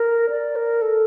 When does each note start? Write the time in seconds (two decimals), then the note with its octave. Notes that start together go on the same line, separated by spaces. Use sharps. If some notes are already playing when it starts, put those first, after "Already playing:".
Already playing: A#4
0.30 D5
0.56 A#4
0.82 A4